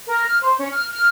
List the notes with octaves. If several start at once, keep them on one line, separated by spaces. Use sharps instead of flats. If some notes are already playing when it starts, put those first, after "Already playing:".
A#4
F6
C5
C#4
F6
F6